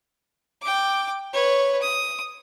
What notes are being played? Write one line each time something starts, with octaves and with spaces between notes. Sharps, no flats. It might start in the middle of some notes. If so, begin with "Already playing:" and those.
G5 D6
B4 C#5
D#6